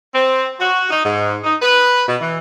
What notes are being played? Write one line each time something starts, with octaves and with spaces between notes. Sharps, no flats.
C4
F#4
D#4
G#2
D#4
B4
B2
E3